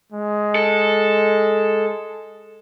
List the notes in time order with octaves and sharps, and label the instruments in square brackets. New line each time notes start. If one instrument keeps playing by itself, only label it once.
[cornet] G#3
[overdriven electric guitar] A4